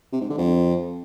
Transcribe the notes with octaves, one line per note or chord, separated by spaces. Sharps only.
C3
G#2
D3
F2